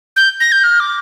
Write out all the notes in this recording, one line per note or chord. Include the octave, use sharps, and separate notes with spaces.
G6
A#6
G6
F6
D6